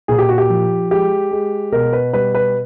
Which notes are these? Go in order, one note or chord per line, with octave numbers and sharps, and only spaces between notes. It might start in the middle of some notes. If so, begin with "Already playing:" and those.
A#2 G#4
G4
F#4
G4
F3
G#3 G4
G#3
B2 A#4
B4
G3 B4
B4